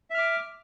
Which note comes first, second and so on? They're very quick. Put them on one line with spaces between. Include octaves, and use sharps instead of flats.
E5 F6 D6